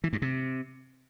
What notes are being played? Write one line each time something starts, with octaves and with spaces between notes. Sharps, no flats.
E3
G2
C3